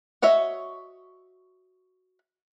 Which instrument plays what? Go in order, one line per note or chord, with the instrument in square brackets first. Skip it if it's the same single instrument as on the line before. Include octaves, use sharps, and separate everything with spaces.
[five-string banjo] F#4 C#5 D#5 E5